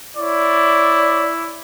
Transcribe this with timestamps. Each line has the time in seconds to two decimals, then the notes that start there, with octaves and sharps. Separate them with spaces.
0.17 E4 C#5 D5